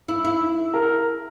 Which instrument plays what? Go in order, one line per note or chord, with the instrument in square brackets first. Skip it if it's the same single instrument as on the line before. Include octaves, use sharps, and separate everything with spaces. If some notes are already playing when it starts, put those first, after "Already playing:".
[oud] E4
E4
[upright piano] A#4